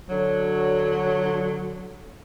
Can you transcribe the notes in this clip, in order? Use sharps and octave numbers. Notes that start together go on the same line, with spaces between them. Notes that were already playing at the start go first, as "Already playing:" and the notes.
D3 F#3